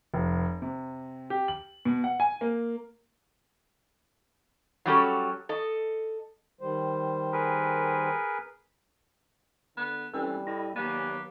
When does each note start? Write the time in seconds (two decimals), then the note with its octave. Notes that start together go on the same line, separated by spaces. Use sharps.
0.14 F1
0.62 C3
1.30 G4
1.48 F#7
1.85 B2
2.04 F#5
2.20 G#5
2.41 A#3
4.85 F#3 G3 C#4 A4
5.49 A4 D#5
6.61 D#3 G3 C5
7.32 G#4 A#4 B4
9.77 D3 B3
10.14 E3 G3 C4 C#4 A4
10.47 A2 E4 D#5
10.76 D#2 F#3 A#3 B3 G4 D5 G#5